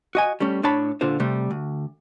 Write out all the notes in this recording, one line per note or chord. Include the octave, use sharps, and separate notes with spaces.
F#4 D#5 G#5
G3 A3 C#4
A2 D4 C#5 A5 B5
A#2 D3 F4 C5
C3 G3 A3
D2